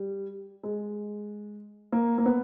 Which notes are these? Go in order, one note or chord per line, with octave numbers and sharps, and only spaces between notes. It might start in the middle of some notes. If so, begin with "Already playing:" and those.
Already playing: G3
G#3
A#3
A#3
B3